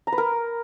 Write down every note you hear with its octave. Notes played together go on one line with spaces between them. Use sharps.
A#5
B4
A#4